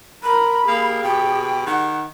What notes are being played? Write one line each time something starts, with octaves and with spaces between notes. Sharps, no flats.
A#4 B5
A#3 G4 G#4
B2 G5
D#3 F#5